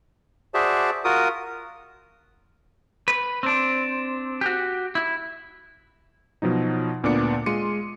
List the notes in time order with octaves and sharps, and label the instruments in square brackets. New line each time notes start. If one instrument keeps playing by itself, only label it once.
[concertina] F#4 G#4 C5 D5 E5 A5
F4 F#4 A#4 D#6
[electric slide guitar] B4
C4 D4
F#4 G4
E4
[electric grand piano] B2 F3 F#3 D#4
D2 A#2 B3 D4 D6 C#7
G#3 F4 C6 C#7 D#7